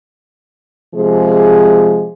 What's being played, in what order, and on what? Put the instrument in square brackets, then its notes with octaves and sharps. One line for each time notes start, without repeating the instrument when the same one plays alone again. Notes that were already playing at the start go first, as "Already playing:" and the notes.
[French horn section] C3 F3 G#3 G#4